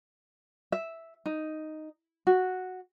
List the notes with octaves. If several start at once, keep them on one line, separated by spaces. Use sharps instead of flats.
E5
D#4
F#4